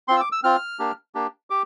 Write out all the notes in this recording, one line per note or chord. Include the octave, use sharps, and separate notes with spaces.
C4 F4 C6
E6
D6
E6
C4 F4 F6
A#3 D4 G4
A#3 D4 G4
G4 D6